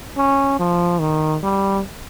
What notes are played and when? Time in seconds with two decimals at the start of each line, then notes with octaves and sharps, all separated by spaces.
0.17 C#4
0.59 F3
1.00 D#3
1.43 G3